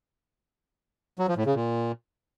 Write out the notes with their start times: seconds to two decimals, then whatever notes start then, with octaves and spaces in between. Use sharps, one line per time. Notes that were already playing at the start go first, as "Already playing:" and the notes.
1.19 F#3
1.28 F3
1.37 A2
1.46 C#3
1.55 A#2